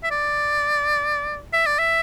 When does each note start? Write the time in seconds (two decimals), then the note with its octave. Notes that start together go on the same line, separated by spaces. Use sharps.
0.04 E5
0.11 D5
1.53 E5
1.66 D5
1.79 E5